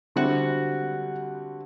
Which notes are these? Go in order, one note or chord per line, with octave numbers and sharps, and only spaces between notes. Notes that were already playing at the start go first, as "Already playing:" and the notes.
D3 G3 C4 E4 F#4